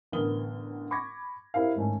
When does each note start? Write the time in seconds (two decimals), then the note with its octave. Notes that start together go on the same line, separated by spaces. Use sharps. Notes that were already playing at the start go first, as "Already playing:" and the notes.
0.12 A1 D3 B3 A#4 D#6 G7
0.91 B5 C#6 D6 G#6 A#6
1.54 C4 E4 G4 A#4 F5
1.76 G#2 D#3 A3 C#4